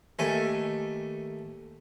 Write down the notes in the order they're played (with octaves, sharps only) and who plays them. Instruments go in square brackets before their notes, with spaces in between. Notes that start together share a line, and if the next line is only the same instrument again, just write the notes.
[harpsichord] D#2 A3 G#5